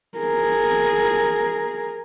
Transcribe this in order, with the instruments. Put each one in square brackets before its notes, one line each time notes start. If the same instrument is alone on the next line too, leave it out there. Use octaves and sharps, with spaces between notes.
[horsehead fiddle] G#4 A#4